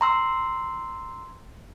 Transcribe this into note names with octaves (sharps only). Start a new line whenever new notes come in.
A#5 C6 E6